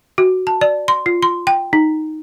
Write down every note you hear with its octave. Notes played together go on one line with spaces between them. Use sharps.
F#4
A5
D5
C6
F4
C6
G5
D#4